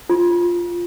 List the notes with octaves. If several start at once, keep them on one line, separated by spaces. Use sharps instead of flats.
F4